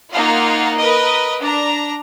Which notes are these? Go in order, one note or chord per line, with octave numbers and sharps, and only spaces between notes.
A#3 D#4 F4 F5 F#5
A#4 B4 D#5
D4 A#5